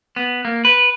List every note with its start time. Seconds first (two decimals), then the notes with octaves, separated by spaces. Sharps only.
0.16 B3
0.45 A#3
0.65 B4